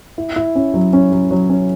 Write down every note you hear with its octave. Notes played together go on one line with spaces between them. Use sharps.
E4
E4
C#4
F#3
C#4
F#3
F#3
C#4